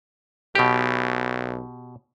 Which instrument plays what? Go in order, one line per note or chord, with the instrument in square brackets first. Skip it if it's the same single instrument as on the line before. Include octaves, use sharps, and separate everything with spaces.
[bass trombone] B1 [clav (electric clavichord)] B2 G4